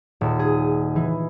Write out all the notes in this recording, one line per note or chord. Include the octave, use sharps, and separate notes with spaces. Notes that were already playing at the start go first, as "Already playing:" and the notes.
D#1
G#4
E3